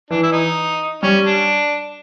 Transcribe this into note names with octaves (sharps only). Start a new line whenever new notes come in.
E3 D4
E4
D#4
G3 C#4
D4